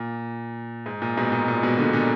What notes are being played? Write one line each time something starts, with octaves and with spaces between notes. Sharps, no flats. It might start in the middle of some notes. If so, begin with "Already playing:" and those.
Already playing: A#2
G#2
A#2
G#2 B2
A#2
A#2
G#2 B2
A#2 D3
A#2 D3